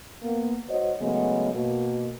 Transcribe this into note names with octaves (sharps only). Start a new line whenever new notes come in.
A#3 B3
G#2 F#4 C5 C#5 D#5
C#3 F#3 G#3 A3 B3
B2 A#3